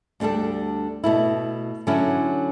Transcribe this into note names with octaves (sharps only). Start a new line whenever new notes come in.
D2 D3 G3 D4 A4
B2 A3 E4
D3 F#3 C#4 E4